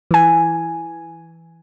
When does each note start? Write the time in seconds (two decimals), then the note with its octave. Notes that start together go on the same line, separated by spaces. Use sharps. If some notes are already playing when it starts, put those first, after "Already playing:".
0.11 E3 G#5